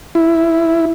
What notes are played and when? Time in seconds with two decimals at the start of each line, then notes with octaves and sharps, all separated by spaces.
0.15 E4